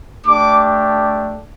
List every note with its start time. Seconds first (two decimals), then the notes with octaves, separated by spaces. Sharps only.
0.24 A3 D4 G4 D6